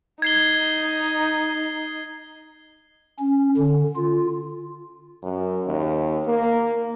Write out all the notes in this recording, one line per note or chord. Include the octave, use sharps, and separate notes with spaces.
D#4 G#6 C7 G7
C#4
D3
F4
F#2
D#2
A#3